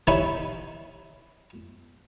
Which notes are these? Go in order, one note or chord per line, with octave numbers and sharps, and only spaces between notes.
E3 G3 D#4 E4 B4 C#5